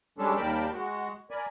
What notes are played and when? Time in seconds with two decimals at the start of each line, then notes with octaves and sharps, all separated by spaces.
0.18 G3 G#3 C#4 D4 A4
0.37 D#2 G3 A#4 G5 A5 B5
0.73 G#3 F#4
1.31 A#4 D5 G#5 B5